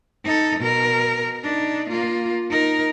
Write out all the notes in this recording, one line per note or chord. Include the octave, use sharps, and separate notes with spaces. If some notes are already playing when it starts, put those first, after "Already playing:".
D#4 A4
B2 A#4
D4 D#4
A#3 F4
D#4 A#4